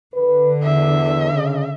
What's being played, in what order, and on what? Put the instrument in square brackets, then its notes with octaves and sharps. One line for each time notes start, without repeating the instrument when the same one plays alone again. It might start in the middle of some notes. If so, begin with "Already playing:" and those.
[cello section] D3 [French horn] B4
[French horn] E2 [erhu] E5
[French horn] C#3